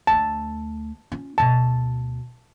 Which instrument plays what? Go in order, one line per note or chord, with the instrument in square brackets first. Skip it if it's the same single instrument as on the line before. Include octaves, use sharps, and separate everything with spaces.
[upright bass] D2 A3 [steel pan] A5
[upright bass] C#4 F4
[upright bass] D2 B2 [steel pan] A5